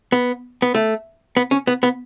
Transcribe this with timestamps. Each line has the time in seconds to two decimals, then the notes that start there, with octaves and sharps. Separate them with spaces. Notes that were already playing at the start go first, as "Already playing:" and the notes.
0.12 B3
0.62 B3
0.75 A3
1.37 B3
1.51 C#4
1.67 B3
1.83 B3